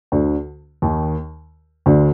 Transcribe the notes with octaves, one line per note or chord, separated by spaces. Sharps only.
D2 D3
D#2 D#3
D2 D3